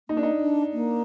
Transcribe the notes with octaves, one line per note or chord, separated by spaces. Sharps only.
A#3 D#4
D4
D#4
D4
A#3